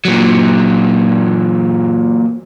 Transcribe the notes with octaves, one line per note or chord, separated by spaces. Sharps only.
A#2 F#3